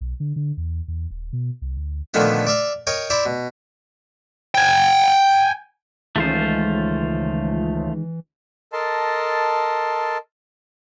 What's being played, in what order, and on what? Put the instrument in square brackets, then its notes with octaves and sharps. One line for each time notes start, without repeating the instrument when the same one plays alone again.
[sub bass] B1
D3
D3
E2
E2
D#1
B2
C2
D2
[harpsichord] A#2 D3 D#3 F3 A3 B3
D5 E5 F5
A#4 C#5 D#5 G5
E4 C5 D5 A#5
B2
[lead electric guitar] G5 G#5
[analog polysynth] C#2 [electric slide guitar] D#3 G#3 [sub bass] E3 [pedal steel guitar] A3 F4 C5
[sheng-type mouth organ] A4 A#4 D#5 A5 C6